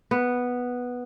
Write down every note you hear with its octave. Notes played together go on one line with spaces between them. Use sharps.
B3